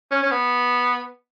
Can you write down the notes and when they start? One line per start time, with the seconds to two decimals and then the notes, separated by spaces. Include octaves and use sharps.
0.11 C#4
0.23 C#4
0.31 B3